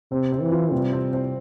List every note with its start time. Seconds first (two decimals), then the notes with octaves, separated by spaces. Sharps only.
0.11 C3 C4
0.32 C4
0.42 E3
0.52 F4
0.72 C3 G3
0.93 C4
1.13 C4